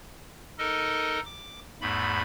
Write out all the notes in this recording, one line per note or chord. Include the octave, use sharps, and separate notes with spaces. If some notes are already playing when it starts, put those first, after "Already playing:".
D#4 A4 A#4 D#5
D6
E2 G#2 A3 B5